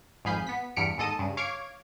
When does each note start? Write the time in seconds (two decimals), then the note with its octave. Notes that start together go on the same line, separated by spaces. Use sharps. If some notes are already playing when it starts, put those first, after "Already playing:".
0.25 G#1 F2 G#4 F5 B5 G6
0.47 B3 B6
0.76 E2 G2 F6 B6 C#7 D7
0.98 D#2 G#2 A4 D#5 A5 D#6
1.19 G2 C#3
1.37 C#5 F5 D6 G#6